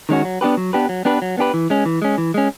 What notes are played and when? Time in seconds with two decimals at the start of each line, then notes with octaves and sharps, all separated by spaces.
0.09 D#3 G#3 C#4 F#4
0.25 F#3
0.41 B3 D4 G4 B4
0.57 F#3
0.73 B3 D4 G4 B4
0.89 F#3
1.05 B3 D4 G4 B4
1.22 F#3
1.38 B3 D4 G4 B4
1.54 E3
1.70 G#3 C#4
1.85 E3
2.02 G#3 C#4
2.18 E3
2.34 G#3 C#4